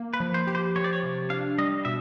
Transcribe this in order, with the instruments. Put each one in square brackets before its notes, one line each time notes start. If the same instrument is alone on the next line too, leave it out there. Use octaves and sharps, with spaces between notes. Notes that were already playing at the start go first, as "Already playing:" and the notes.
Already playing: [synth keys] A#3
[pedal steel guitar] B4
[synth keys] F3
[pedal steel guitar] C5
[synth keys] G4
[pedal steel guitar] C5
[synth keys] F3 [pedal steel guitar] C#5
[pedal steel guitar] D5
C#5
[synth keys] C3
[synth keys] D4 [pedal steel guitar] F5
[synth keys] G3 [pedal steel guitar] D#5
[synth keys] B2 [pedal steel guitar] E5